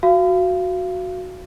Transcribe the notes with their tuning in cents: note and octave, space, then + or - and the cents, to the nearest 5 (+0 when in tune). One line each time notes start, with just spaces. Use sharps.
F#4 -10 F5 -25